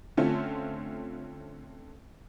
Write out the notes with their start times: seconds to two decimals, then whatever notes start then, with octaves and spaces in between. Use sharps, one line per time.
0.17 D3 A3 C4 C#4 F4